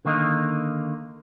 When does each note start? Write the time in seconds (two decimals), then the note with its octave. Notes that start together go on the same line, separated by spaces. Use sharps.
0.05 D3 D#3 A#3 D#4